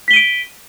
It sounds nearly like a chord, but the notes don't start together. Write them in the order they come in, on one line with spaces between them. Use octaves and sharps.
B6 G7 D#7 D7